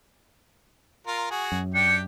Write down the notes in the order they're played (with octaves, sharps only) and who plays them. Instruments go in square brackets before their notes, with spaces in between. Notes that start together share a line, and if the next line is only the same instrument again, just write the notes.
[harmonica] F4 A#4
F#4 G#4
[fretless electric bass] F#2
[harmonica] D4 G4 G5 [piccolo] C#7